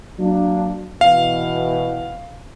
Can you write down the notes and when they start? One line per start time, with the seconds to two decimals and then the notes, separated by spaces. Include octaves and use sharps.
0.19 F#3 A#3 D4
1.01 B2 E3 F5